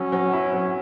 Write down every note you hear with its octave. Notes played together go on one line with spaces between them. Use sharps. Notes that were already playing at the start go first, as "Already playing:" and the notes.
Already playing: F#3 C#4
F#3
E4
F#3